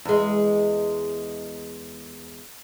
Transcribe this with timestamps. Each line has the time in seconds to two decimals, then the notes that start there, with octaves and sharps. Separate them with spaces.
0.05 E2 G#3